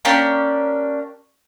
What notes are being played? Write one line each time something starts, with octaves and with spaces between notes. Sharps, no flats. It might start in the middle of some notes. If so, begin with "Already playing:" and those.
A#3 C#4 D4 G4